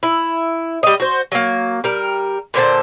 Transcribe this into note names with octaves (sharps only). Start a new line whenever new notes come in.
E4
G3 D#5
F#4 C5
F#3 A#3
G3 A#4
A#2 D3 C5 A5